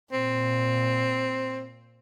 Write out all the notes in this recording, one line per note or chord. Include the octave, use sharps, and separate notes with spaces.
A#2 C4